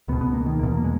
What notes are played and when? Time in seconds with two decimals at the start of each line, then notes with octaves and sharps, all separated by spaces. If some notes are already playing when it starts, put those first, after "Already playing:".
0.08 C#2 B3
0.13 B2
0.21 B3
0.34 A#3
0.46 D#3
0.59 E2 B2 A#3
0.77 A#3
0.84 G#3